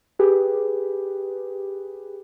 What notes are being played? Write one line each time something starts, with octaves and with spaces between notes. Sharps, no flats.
G4 G#4 B4